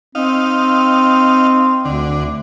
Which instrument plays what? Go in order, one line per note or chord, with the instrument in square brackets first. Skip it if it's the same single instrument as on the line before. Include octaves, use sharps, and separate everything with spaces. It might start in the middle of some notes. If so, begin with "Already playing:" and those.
[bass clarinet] C4 [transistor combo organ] D#4 F5
[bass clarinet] D2 [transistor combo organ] D3